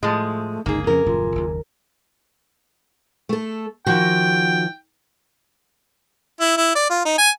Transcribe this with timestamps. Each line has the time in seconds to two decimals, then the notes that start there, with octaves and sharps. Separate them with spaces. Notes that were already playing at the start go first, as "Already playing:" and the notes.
0.03 A2 F3 G#3 A3
0.66 G1 C#2 G2 A#3 D#4 G#4
0.87 F2 C#3 F3 C#4 A#4
1.06 D#1 F#2 C#3 F4
1.35 F#1 D#2
3.29 A3 A4
3.86 D#3 F3 F#4 G5
6.41 E4
6.57 E4
6.75 D5
6.90 F4
7.05 D#4
7.18 G#5